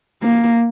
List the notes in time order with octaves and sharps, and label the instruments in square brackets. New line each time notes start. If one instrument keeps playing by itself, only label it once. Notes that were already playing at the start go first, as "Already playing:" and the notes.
[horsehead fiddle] A#3